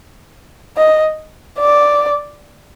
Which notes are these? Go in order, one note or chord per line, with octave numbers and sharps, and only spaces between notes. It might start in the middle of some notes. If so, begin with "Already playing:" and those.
D#5
D5